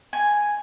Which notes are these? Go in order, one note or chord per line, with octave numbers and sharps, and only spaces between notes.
G#5